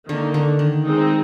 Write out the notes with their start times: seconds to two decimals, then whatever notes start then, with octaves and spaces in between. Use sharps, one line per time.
0.08 D3 D#3 A#3 D#4
0.34 D3
0.59 D#3
0.85 G#3 C4 D#4